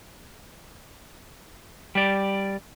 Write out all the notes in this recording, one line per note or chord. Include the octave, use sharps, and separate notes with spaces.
G3 D5